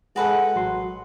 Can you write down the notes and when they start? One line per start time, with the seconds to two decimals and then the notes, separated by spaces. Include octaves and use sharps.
0.16 G#3 F#4 G#4 A4 B4 F#5
0.56 A1 F#3 C6